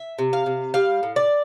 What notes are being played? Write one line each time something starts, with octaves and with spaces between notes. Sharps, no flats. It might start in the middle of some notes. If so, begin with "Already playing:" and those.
Already playing: E5
C3
F5
C3
G3 F5
A2
D5